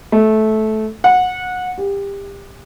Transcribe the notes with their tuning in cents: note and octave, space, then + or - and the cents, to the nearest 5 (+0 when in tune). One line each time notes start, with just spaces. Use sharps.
A3 -15
F#5 -20
G4 +25